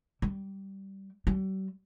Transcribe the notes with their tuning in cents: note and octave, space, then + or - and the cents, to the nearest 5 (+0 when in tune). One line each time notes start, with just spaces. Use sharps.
G3 -10
G3 -45